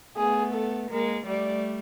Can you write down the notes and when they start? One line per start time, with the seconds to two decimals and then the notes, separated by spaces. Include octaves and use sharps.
0.17 A3 B3 G#4
0.54 A4
0.90 G#3 A#3 A#4
1.26 G3 A3 D5